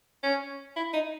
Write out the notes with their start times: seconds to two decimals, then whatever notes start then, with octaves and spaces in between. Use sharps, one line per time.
0.23 C#4
0.76 E4
0.94 D#4